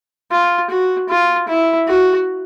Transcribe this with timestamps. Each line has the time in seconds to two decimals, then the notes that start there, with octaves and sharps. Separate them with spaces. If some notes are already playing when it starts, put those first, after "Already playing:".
0.31 F4
0.70 F#4
1.09 F4
1.48 E4
1.87 F#4